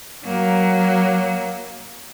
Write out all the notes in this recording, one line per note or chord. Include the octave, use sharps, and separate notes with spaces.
F#3 A#3